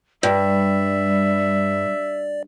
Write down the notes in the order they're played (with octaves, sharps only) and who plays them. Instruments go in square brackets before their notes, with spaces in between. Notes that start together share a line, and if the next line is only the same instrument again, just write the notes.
[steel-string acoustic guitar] G2 [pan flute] G3 [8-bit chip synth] D5 [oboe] E5